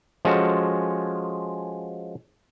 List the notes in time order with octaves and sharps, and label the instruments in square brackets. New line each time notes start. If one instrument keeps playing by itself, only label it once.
[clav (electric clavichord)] F3 G#3 C#4 F#4 A4